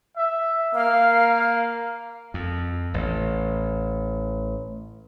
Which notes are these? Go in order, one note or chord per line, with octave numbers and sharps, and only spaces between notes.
E5
A#3 F5
F2
A1